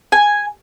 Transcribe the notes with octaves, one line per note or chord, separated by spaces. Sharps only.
G#5